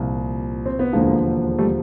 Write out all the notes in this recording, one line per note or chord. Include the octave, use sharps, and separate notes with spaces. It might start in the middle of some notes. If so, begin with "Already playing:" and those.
Already playing: C2 A#2 F3
C4
B3
E1 D#2 D3 F3 G#3 A#3
G3 A3